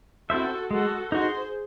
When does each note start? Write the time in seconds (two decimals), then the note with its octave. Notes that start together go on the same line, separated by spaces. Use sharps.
0.30 C4 E4 F#4 A4 C5 E5
0.70 G#3 F#4 A4
1.12 D#4 F#4 G#4 C5